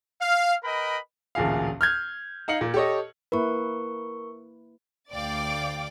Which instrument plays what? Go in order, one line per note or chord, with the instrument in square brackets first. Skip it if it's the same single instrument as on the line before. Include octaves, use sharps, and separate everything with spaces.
[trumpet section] F5
A#4 B4 D#5 G5 B5
[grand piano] A1 D2 A#2 G#4 F5
F6 G6 G#6
D#4 F5 C#7 F#7
A#2
G4 A4 C#5 D#5
[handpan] A#3 E4 B4 [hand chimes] A#4 C#6
[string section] D2 D5 F5 G5 D6 A6